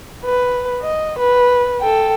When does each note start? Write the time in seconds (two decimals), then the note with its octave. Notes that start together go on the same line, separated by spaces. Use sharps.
0.25 B4
0.81 D#5
1.18 B4
1.81 A4 G5